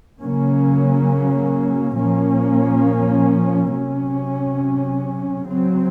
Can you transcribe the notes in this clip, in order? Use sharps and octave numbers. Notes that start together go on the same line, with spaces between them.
C#3 F#3 A#3 C#4
A#2 F3 A#3 C#4
C3 F#3 C#4
C#3 F#3 C4